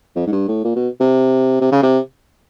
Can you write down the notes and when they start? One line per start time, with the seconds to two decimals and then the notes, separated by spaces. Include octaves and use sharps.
0.16 F2
0.27 G#2
0.32 G2
0.48 A2
0.64 A#2
0.76 B2
1.01 C3
1.61 C3
1.72 C#3
1.83 C3